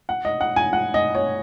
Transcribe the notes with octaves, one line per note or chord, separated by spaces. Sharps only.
F#5
D#5
F#5
G#5
F#5
D#5
C#5